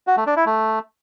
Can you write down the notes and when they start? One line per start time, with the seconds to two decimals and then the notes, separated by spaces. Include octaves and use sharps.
0.07 F#4
0.17 A3
0.27 D4
0.36 E4
0.46 A3